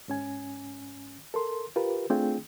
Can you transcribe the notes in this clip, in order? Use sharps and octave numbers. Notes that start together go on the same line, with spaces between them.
G#2 C#4 G#5
A4 A#4 C6
F4 G4 A#4 B4
A3 C4 D4 F4 G#4 G5